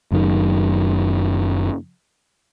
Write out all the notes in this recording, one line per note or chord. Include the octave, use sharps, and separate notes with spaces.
F#1 F#2 B2 D#3